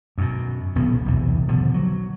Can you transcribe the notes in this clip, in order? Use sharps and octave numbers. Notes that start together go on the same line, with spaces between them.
F#2 B2
D#1 B1 C3 B3
B1 E2 C3
B2 D3 D#3 F3
F#3